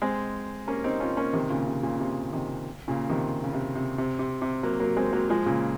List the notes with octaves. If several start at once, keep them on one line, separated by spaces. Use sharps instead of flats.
G#3 C4
A#3 C#4
C4 D#4
C#4 F4
A#3 C#4
C3 D#3
A#2 C#3
C3
A#2 C#3
C3
C3 D#3
A#2 C#3
C3 D#3
C#3
C3
C3
C3
C3
C3
F#3 A#3
F#3 A#3
G#3 C4
F#3 A#3
F3 G#3
A#2 C#3